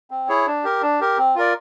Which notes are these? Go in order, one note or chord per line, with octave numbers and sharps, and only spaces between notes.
C4
E4 G#4 C#5
D4
G4 A#4
D4
G4 A#4
C4
F4 A#4 D5